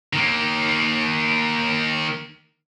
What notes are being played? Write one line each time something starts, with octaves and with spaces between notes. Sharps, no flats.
D#3 A#3